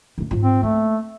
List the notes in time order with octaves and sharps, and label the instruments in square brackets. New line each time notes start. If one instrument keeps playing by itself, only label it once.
[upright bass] F#2 D3
G#2 F4
[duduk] C4
[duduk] A3 [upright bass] A#3